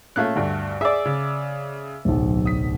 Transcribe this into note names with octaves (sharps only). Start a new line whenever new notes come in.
A#2 A3 C#4 F5 F#6
D2 G2
G#4 D5 E5 E6
C#3
D1 B1
D#6 B6